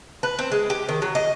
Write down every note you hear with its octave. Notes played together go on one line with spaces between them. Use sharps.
B4
C4
G#3
G4
D#3
F#3
D#5